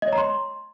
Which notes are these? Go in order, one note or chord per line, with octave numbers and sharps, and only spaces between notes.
D#5
C#5
A#5
C6